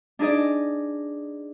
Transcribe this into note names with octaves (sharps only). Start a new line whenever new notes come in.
D4 D#4 G#4 D5 D#5